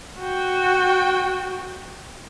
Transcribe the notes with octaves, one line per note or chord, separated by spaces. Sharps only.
F#4 G5